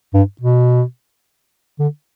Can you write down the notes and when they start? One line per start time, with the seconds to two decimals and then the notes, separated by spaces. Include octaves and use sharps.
0.14 G2
0.41 B2
1.79 D3